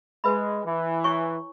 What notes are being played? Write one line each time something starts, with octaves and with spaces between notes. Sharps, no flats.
G#3 B4 E5 B5
E3
E4 C#5 G#5 C#6